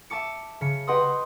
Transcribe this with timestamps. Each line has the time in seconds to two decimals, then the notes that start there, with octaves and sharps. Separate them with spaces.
0.10 E5 A5 D6 C#7
0.61 C#3 B6 C#7
0.87 G4 B4 D#5 F#5 C6 D#6